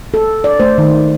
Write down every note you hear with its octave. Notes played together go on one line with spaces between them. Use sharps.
A4
D5
A3 C5
D#3